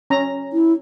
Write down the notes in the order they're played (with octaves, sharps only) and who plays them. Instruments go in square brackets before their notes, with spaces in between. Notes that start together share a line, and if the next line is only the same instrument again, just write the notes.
[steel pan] C#4 A#5
[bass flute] E4